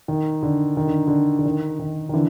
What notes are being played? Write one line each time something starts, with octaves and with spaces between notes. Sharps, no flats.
D#3
D3
D#3
D3
D3
D3
D#3
D#3
D#3
D3 E3